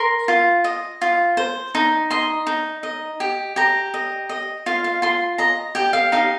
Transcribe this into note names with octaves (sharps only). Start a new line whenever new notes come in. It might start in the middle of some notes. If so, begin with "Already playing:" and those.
Already playing: A#4 C6
F4
D#5
F4
C5
D#4
D#5 C6
D#4
D#5
G4
G4 A#5
D#5
D#5
F4 F5
F5
F4 C6
D#5 A#5
G4 G5
F5
D#4 F5